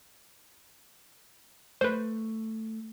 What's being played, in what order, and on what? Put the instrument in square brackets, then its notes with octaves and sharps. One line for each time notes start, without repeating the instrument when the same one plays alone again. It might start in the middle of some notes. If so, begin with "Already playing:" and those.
[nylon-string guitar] A3 [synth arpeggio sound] B4 C5